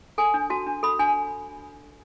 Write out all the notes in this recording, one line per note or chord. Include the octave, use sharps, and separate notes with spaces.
A4 G#5
D4
F#4 A5
D4
A4 B5
D4 G#5